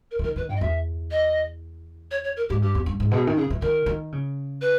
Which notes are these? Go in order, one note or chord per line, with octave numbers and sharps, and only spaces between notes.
A#4
E3
D#3 A#4
D#3 B4
G2 G5
D#5
E2 E5
D#5
C#5
C#5
A#4
G#2 G4
G2 G4
E2
G2
G#2
B2 G#4
D#3
C#3 G#4
E3
D#3 A#4
D#3
C#3
B4